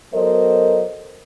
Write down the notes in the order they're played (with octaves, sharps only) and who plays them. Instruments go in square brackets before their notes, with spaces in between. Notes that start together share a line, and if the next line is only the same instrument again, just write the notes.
[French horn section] F#3 B3 A4 A#4 C5 D#5